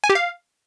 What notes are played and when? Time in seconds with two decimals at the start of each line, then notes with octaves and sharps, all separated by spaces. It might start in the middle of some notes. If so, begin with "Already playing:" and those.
0.04 G#5
0.09 G4
0.15 F5